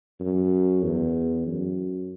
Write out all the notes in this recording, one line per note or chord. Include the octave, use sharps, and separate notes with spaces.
F#2
E2
F#2